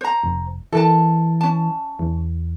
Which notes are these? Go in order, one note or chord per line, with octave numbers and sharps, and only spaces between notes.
C5 A#5
F1
E3 A4 A#4 A5
C#4 A5
E2